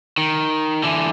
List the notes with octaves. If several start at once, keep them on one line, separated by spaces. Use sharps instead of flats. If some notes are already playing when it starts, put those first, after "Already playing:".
D#3
D3 E3